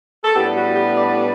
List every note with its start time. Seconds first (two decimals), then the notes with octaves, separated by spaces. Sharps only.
0.24 A4
0.34 A2 G3 B3 D4 G4
0.55 F#4
0.75 G4
0.97 D5
1.17 D5